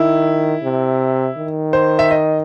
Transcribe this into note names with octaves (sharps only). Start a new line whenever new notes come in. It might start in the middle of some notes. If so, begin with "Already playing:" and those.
Already playing: D#3 E4
C3
D#3
C5
E5
D#5